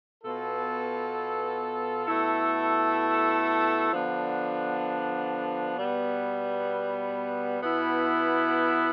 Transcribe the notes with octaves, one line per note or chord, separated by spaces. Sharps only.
B2 B3 F4 A4
B2 A3 E4 A4
D3 F3 B3 D4
B2 G3 B3
B2 B3 E4